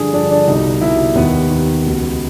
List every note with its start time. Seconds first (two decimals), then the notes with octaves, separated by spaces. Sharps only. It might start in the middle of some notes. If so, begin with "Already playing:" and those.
Already playing: G2 D3 F3 G#4
0.13 G2 D3 F3 D4
0.30 D4
0.47 C2 B2 D#4
0.81 C2 B2 E4
1.15 D#2 D#3 B3
1.50 D#2 D#3
1.84 C#2 B2